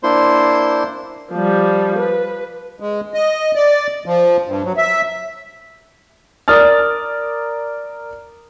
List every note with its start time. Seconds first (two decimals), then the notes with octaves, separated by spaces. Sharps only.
0.03 A#3 D4 E4 C5 C6
1.32 F3 G3
1.99 B4
2.80 G#3
3.14 D#5
3.55 D5
4.06 F3
4.45 G2
4.64 F#3
4.77 E5
6.48 A#4 D5 D#6 F6 A6